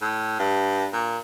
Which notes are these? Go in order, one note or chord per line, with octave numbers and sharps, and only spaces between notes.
A2
G2
A#2